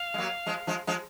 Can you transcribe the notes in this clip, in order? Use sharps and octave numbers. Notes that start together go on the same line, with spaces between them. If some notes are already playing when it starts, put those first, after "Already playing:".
Already playing: F5
G#3
F#3 A#3
F3 G#3
F3 G#3
F3 G#3